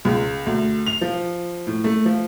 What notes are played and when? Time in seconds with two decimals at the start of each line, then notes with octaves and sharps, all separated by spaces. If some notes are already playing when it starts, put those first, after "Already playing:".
0.05 C#2
0.46 D2
0.86 F7
1.01 F3
1.67 A2
1.84 A3
2.06 F3